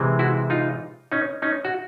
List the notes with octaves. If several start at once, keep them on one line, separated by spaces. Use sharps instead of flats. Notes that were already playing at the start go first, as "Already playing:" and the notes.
Already playing: C3 E3 G#3 C4
E4 F#4
D#4 F4
C#4 D#4
C#4 D#4
F#4